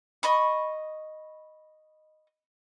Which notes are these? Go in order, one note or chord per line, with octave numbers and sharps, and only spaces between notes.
D#5 B5 C#6